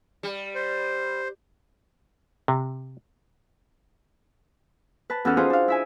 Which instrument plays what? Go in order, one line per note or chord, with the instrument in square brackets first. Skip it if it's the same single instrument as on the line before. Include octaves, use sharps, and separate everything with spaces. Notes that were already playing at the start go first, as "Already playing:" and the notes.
[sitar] G3
[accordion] C5
[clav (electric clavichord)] C3
[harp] B4 A5
E2 C#4 F#4 A4 F#5 F6
D#4 F4 F#4 G#4 B4 C5
D4 F5
E4 E5 G#5